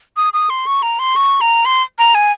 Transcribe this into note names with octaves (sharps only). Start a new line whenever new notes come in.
D#6
D#6
C6
C#6
A#5
C6
C#6
A#5
C6
A#5
G#5